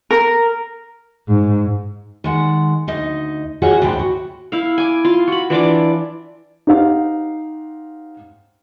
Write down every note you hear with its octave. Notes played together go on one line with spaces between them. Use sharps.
A#4
G#2
D#3 G#3 F#5
D2 D#4 D#5
F4 F#4 G#4 C#5 D#5 F#5
D2 G#2 E3 D5 G5
F#4
E4 F5
G#5 D6
F4 C6
F#4 B5
E3 D4 F4 D6
D#4 G4 C5 F5 F#5